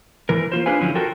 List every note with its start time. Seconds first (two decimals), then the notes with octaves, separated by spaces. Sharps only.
0.29 E3 A#4
0.52 A#3 F4 C5
0.66 D4 F4 G#4 B4 F5 G#5
0.81 D3 F3 F#3 C#4 E4
0.95 F4 F#4 A4 A#4 G5